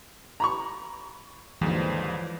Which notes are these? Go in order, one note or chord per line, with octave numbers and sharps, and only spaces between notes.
A#5 B5 C#6
D#2 G#2 D3 E3 F3 G3